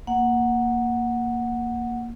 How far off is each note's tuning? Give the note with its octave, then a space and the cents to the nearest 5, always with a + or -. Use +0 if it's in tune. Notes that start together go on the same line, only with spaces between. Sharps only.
A#3 +0 F#5 -5